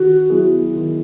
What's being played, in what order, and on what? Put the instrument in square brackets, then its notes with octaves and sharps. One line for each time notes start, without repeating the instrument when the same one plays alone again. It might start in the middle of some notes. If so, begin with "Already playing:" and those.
Already playing: [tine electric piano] D#3 [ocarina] F#4
[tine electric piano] F#3 B3 E4 G#4
D#3